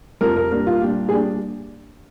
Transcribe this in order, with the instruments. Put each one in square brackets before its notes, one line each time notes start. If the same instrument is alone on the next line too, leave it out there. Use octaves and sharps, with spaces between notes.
[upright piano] F2 C3 F3 A#4
A#4
A#2 G3 D4 A#4
F4
A#2 G3 D4 G4
G#4
A#2 G3 D4 G4